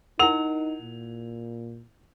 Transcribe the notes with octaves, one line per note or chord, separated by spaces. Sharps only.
D#4 E4 A#4 F#5 F7
A#2